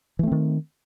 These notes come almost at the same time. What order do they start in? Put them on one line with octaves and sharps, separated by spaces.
E3 A3 C4 D#3